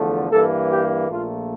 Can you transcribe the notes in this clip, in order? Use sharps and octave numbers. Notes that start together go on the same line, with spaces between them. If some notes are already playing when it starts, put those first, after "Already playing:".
Already playing: E2 D3 F3 A3
G2 E3 A#3 A4
G4
A#1 A#2 A3 F4